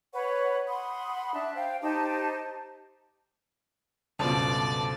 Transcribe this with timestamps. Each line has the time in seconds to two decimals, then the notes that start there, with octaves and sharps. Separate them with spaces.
0.14 B4 C#5 F#5 C#6
0.67 F#5 B5 C6 D#6
1.33 D4 E5 A5 F#6
1.55 C5 F5 G5
1.82 D#4 G4 C5 A5
4.19 C#2 G2 B2 D3 F3 D5 A5